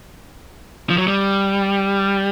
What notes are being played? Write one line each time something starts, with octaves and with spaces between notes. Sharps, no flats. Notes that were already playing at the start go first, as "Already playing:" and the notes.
F3
F#3
G3